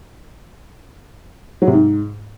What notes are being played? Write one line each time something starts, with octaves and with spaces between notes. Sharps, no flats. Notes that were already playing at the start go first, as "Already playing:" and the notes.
F#3
C3
G#2